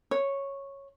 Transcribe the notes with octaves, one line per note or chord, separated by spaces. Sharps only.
C#5